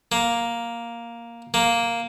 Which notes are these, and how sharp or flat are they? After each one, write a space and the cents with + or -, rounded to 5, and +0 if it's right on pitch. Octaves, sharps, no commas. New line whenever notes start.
A#3 +5
A#3 +0